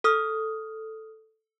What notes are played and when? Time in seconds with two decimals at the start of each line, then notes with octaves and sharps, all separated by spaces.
0.04 A4 D#6 F6